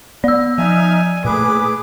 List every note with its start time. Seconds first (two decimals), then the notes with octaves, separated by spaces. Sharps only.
0.24 B3 D5 E6
0.58 F3 D#4 E5 G#5 F6
1.25 A#2 A3 G#4 B4 D6